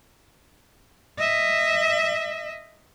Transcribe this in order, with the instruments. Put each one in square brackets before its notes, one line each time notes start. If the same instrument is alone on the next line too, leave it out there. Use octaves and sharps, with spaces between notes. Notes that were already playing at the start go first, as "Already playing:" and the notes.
[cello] D#5 E5